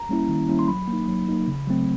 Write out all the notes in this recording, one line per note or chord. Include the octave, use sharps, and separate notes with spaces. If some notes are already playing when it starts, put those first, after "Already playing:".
Already playing: A#5
G3 A#3 C#4 E4
D#3
G3 A#3 C#4 E4
C6
F#3 B5
A#3 D#4
F#3
A#3 D#4
C#3
F#3 A3 C4